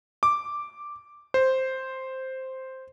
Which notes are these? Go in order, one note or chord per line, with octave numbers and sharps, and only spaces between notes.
D6
C5